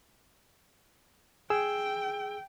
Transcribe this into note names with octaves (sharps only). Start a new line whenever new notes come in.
G#4 G5 E6